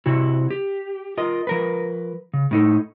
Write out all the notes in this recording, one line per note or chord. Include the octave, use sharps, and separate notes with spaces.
C3 E4 F#4
G4
F4 A#4 D#5
F3 A#4 B4
C#3
A2 D#4 A4